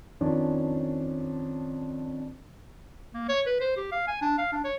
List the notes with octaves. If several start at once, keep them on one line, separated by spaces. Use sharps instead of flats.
F2 D#3 C#4 D4
A#3
C#5
B4
C5
G4
F5
G#5
D4
F5
D4
C#5